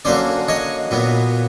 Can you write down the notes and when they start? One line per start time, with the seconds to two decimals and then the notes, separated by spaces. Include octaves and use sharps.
0.05 D3 F#3 A#3 C#4 C5 D5
0.48 C#5 D#5
0.91 A#2 F#3 B3